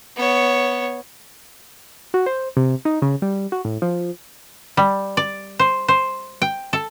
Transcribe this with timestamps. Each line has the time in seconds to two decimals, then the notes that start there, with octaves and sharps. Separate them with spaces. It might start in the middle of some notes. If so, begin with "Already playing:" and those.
0.16 B3 C#5
2.14 F#4
2.26 C5
2.57 C3
2.85 D#4
3.02 C#3
3.22 G3
3.52 F#4
3.65 A2
3.82 F3
4.77 G3
5.17 D5
5.59 C5
5.88 C5
6.42 G5
6.73 A4